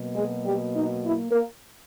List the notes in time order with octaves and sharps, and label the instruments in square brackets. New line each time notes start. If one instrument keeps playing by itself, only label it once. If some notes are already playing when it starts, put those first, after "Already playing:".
Already playing: [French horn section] B2 F#3 A#3
G#3 G#4
G3 G4
D#4
E4
A#3 A#4